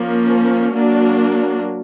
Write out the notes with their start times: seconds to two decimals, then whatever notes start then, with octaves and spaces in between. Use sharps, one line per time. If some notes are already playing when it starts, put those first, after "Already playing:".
Already playing: F3 A#3 C#4
0.74 F#3 A#3 D4